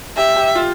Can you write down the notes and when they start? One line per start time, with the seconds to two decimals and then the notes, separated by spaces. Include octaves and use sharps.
0.17 G4 E5
0.36 G4
0.55 F4